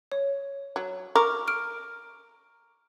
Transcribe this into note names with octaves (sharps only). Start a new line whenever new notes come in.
C#5
F#3
A#4 C#6 D6 F6
F6 D7